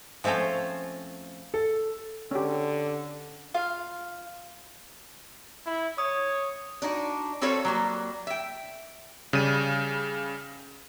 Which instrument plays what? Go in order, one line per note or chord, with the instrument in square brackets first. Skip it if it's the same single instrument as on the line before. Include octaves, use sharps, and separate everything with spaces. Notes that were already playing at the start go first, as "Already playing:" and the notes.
[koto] F3 A3 C4 C#4 F4
[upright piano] A4
[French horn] D3 [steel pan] C#4 G4
[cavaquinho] F4 F5
[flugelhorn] E4
[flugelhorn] C#5 [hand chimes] D#6
[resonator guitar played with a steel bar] D4 D#4 F#4
G3 C4 F#4 A4 C#5 F5
F#3 G3 A#3
E5 G5
[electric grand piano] C#3 G3 D#7